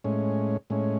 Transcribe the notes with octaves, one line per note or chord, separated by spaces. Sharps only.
A2 G#3 C#4
A2 G#3 C#4